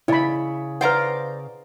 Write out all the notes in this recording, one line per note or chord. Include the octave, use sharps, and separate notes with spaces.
C#3 E4 D5 D#5 B5
B4 C5 D5 F5 F#5 A#5